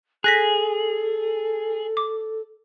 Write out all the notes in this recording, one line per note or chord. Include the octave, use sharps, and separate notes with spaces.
G#4 A4 F#6 A#6 B6
D6